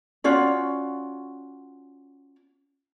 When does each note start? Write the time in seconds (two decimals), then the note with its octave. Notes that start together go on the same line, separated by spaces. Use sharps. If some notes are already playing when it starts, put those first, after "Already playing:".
0.24 C#4 F4 F#4 D5